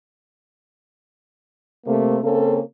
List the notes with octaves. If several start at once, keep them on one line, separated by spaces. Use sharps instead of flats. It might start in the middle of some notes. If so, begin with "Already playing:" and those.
C3 A3 A#3
C#3 A#3 C4 C#4 G#4 A4